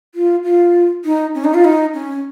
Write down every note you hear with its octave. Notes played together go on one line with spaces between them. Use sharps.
F4
F4
D#4
C#4
D#4
F4
D#4
C#4